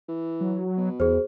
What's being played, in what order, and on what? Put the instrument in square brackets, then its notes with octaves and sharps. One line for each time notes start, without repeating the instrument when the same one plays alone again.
[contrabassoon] E3
[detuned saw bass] F#3
[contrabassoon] B2
[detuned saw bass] E2 [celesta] G#4 C5